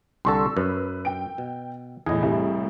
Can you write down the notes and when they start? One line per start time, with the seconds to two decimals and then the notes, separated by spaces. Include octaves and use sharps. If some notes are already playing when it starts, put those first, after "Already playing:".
0.25 C2 D3 A4 C6 C#6 E6
0.57 F#2 B4
1.05 G5 D7
1.38 B2
2.06 E2 A2 G#4 D#5
2.22 C2 A2 G3